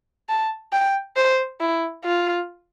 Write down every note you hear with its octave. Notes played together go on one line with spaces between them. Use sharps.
A5
G5
C5
E4
F4